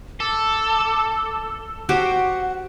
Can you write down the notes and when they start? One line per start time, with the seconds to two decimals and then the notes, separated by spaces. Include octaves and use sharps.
0.20 A4 D6
1.89 F#4 G4 C5 F#5